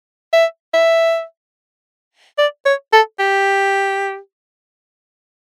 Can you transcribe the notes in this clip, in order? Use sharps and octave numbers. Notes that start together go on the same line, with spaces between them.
E5
E5
D5
C#5
A4
G4